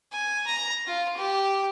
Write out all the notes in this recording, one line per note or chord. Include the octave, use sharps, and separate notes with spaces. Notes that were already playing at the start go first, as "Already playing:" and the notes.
G#5
A#5
F4
G4